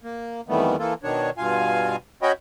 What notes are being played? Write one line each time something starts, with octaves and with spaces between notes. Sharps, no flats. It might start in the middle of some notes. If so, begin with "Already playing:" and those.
A#3
F2 D#3 E3 G3 A3 B3
E3 A#3 F4 A4
B2 D#3 D4 C#5
G2 B2 F4 F5 G#5
C#4 F#4 C#5 D#5 G5 B5